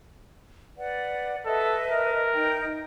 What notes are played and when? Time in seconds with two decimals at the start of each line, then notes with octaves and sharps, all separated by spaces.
0.77 B4 D5 F#5
1.46 A4 B4 D#5 E5
1.90 A#4
2.33 D#4 G5